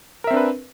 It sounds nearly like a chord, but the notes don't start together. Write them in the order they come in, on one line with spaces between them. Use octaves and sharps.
A#4 E5 C4 D4 B4